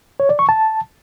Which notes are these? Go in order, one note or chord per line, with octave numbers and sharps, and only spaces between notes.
C#5
D5
C#6
A5